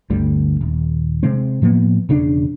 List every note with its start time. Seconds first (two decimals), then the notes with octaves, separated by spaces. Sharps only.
0.10 G1 D2 G3
0.61 D#1
1.23 C3 G#3 C4
1.62 A2 F3 A#3 B3
2.09 E1 C#3 D4